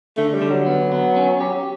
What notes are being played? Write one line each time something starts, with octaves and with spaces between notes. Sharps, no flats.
D3 A3
G3
D3
F#3
B3
B3
C#4
G4